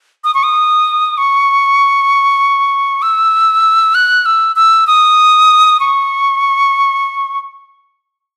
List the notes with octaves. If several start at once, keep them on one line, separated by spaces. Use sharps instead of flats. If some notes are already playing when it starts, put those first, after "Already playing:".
D#6
C#6
D#6
C#6
E6
F#6
E6
E6
D#6
C#6